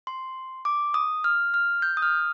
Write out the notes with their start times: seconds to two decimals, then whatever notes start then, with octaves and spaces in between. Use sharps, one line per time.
0.07 C6
0.65 D6
0.94 D#6
1.24 F6
1.54 F6
1.82 G6
1.97 D#6
2.02 F6